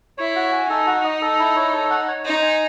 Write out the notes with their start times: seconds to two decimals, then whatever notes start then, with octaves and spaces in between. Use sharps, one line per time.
0.18 E4 C#5
0.35 F#4
0.53 G#5
0.70 D#4 A4
0.87 F#4
1.04 D#5
1.22 A4
1.39 E4
1.56 C#5
1.73 A4
1.90 F#5
2.08 C#5
2.25 D#4 C5
2.42 G#5